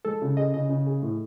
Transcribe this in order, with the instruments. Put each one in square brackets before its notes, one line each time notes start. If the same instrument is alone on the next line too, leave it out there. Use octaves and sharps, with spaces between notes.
[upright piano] G#3 [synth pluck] A4
[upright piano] C#3
[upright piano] G#4 [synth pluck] D#5
[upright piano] C#3 [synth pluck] D#5
[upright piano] C#3
G#4
A2